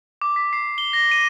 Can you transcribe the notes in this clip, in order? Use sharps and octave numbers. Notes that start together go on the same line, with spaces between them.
D6
B6
C7
G7
A#6
D#7